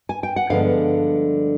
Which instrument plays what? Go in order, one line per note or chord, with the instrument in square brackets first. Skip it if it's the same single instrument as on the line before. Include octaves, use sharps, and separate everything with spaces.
[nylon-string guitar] G#5
G5
F#5
G2 D3 F3 G#3 B3 F5